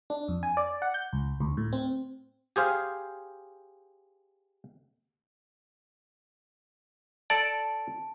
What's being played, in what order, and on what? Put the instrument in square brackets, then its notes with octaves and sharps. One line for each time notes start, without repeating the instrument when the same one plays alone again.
[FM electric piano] D4
F2
G#5
D5
F#5
G6
C#2
D2
A2
C4
[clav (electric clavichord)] G4 G#4 C5 F5
[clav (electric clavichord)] A4 D5 [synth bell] A5